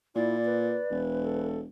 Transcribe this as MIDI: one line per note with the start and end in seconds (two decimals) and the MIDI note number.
0.15 0.79 46
0.15 0.37 64
0.15 0.99 74
0.45 1.47 71
0.90 1.68 28
1.22 1.60 69